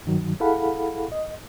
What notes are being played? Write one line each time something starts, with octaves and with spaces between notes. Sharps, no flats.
G2 D#3 F#3
E4 G#4 A4 F5 F#5 B5
D#5